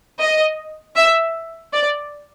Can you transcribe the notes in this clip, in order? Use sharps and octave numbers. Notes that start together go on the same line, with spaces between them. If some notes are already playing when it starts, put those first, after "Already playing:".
D#5
E5
D5